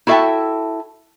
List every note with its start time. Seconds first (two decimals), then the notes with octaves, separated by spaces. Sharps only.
0.07 E4 F#4 A4 E5 G5 A5